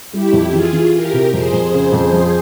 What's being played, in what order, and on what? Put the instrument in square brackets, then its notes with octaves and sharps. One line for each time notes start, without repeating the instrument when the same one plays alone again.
[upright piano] G3 [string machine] E4 G4
[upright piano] F2
[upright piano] E3 [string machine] F4 G#4
[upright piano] E3
[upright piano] E4 [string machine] G4 A#4
[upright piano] C3
[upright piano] F2 [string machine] G#4 C5
[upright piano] F2
C#3
F2
F3